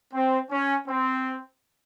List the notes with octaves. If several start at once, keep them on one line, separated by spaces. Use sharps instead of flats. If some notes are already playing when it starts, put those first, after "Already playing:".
C4
C#4
C4